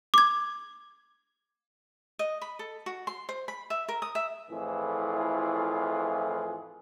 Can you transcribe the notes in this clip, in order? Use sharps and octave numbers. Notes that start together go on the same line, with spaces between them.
D6 G#6
D#5
B5
A4
F#4
C6
C5
B5
E5
A#4
D#6
E5
F2 A2 E3 F4 G#4